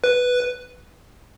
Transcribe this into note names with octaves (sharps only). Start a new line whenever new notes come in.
B4